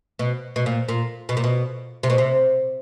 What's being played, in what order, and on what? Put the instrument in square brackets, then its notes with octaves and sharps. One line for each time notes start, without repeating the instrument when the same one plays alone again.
[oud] B2
B2
A#2
A#2
B2
A#2
B2
C3
B2
C3